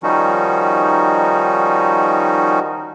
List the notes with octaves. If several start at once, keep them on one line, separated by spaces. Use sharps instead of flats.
D#3 F3 G3 C#4 D#4 F#4